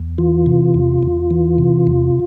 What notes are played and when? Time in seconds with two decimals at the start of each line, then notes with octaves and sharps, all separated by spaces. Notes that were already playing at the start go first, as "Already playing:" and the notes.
Already playing: E2
0.18 E3 F4
0.46 C3
0.74 E2
1.03 E2
1.31 E3
1.58 C3
1.87 E2